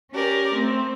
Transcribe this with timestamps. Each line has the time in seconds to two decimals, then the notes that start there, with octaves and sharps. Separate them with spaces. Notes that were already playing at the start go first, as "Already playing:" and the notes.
0.12 C#4 G4 A#4 D5
0.53 A3 C4